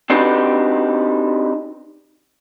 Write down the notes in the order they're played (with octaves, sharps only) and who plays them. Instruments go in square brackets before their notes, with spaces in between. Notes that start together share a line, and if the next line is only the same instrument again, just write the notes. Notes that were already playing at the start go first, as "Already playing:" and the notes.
[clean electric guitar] C4 D4 D#4 F#4 G4 B4